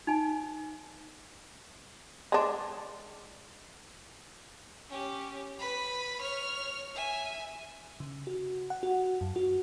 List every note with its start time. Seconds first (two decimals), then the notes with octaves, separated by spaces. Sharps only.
0.07 D#4 G#5
2.32 G#3 D4
4.89 C#4 G4
5.59 B4 B5
6.21 C#5 F6
6.94 E5 G#5
8.00 C#3
8.27 F#4
8.70 F#5
8.83 F#4
9.21 F#2
9.36 F#4